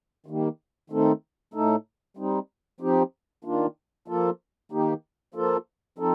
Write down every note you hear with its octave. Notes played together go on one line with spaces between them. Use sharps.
D#3 G3 A#3
D#3 A3 C4 D#4 A4
A2 A3 D#4 A4
G3 C4 D#4
F3 C4 D#4 G4
D#3 A#3 D4 F4
F3 A#3 F4 A4
D#3 A#3 D#4 G4
F3 A#3 F4 A4
F3 C4 D#4 A4